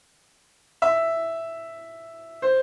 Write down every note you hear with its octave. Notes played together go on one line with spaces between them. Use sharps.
E5
C5